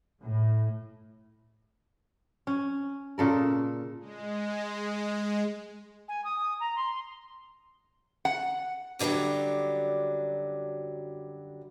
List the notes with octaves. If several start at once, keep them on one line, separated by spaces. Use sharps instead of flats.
A2
C#4
A#2 C#3 A4 A#4
G#3
G#5
D#6
A#5
C6
F#5
F#2 D3 E3 F#3 G3